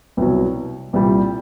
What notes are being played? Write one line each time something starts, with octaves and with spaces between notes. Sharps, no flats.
C2 B2 F#3
C2 A#2 G3